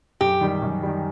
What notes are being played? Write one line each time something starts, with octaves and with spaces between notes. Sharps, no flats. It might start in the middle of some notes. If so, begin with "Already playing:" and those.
F#2 G4
D#3 G3
F#2
D#3 G3